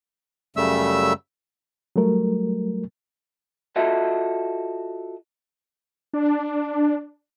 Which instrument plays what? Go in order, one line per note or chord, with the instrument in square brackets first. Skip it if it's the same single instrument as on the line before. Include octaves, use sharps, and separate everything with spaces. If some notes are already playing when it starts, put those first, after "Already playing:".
[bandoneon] F#2 C#3 G3 A3 E5 E6
[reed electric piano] F#3 G3 A3 A#4
[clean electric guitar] F4 F#4 A4 D#5 E5
[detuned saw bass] D4